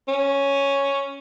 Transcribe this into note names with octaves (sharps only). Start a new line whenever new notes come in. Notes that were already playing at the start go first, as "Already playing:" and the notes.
C#4